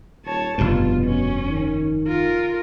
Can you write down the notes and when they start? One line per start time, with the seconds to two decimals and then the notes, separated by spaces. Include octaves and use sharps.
0.25 D#1 C#5 A5
0.58 F1 G2 B2 F4
1.05 C#4
1.49 D#3
2.07 F4 A#4